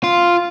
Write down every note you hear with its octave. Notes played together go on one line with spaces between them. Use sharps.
F4